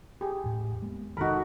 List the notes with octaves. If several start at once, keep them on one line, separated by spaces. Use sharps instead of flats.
G4 G#4
E2 A2
G#3 A#3 B3
F1 D#3 D#4 F#4 A4 A#4 B5